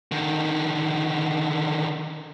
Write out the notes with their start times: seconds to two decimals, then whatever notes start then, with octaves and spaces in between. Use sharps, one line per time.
0.12 D3 D#3